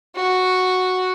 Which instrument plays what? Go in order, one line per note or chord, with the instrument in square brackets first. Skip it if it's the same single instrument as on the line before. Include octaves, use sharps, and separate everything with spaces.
[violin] F#4